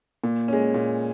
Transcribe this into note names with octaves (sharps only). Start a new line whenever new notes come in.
A#2
G#3 C#4
A#2